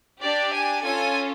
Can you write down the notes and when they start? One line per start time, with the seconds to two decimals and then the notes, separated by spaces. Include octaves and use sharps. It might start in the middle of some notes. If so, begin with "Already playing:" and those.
0.22 D4 G4 D5
0.53 G#5
0.83 C#4 F4 A4 G#5